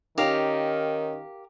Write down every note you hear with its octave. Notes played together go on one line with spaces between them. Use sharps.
D#3 C#4 D#4 G4 A#4 F5